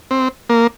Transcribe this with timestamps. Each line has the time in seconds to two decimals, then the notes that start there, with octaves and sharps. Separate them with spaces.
0.11 C4
0.50 A#3